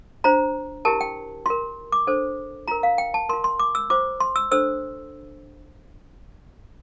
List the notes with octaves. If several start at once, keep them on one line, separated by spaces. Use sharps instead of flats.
D4 F4 C5 A#5
E4 G4 A#4 A5
G5
F4 A#4 C6
D6
D4 A4 C5
F4 A#4 A#5
F5
G5
A5
F4 A#4 C6
C6
D6
E6
F4 C5 D6
C6
E6
D4 A4 C5 E6